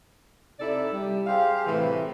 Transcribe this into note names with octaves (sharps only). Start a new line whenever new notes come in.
C3 D#4 E4 A4 D5
G3
G4 G#4 C5 F5
A2 C3 E3